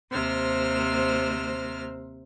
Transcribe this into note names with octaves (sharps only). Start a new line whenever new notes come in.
D#2 C3 C5 F6